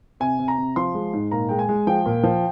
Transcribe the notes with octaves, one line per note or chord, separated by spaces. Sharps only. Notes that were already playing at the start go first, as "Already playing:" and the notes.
C3 G#5
C3
A#5
C3
F3 C6
G#3
G#2
A#2 A#5
G#3 G5
G#5
G#3
F3 G5
A#2
F3